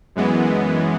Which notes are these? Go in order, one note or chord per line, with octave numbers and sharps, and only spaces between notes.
F#2 E3 G#3 B3